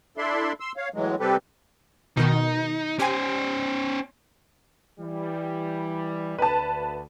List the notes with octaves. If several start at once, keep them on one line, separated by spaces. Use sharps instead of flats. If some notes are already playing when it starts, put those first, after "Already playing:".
D4 E4 A4 D5 E5 C6
C6 E6
C#5 F5
A2 E3 F#3 G#3
C3 G3 C4 G4 A4 B4
B2 D#3 D#4
C#4 G4 C5 G#5
E3 G3
D2 B4 A5